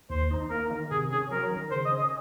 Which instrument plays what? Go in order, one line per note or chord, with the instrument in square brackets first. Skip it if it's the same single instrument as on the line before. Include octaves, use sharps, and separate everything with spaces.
[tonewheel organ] D#2 [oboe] C5
[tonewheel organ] D#4
[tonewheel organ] A#3 [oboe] A#4
[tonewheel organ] D#3
[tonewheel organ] C3 [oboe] G#4
[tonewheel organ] C#4 [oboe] G#4
[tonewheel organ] F#3 [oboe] A#4
[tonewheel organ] D#3
[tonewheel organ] C#3 [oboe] C5
[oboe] D#5
[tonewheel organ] C#4
[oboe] D#5